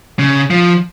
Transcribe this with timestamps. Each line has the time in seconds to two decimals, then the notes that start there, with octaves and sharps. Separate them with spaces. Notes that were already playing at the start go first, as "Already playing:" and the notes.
0.19 C#3
0.50 F3